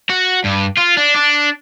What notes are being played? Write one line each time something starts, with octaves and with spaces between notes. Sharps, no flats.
F#4
G2
F4
D4
D4